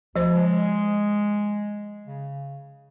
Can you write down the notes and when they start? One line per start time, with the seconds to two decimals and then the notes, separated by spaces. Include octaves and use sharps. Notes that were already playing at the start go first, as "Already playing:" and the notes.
0.16 D2 F3 C5 D#5
0.34 G#3
2.07 C#3